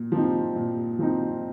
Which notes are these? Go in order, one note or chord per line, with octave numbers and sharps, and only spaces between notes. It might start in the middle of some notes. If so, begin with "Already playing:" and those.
Already playing: A#2
F3 C4 D#4
A#2
F3 C4 D#4